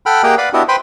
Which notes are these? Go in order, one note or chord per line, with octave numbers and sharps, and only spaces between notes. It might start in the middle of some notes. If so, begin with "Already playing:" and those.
A4 F#5 G5 B5 F6
A#3 G4 G#4 D#5 F#5 G5
B4 D5 F5 F#5 B5
B3 D4 E4 F#4 G4 D#5
B4 C5 G5 B5 C6